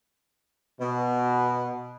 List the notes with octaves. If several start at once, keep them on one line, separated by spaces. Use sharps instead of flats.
B2